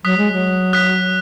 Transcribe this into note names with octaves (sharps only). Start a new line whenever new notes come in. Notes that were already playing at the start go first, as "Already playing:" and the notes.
F#3 D#6 F#6 B6
G#3
F#3
D#6 F#6 B6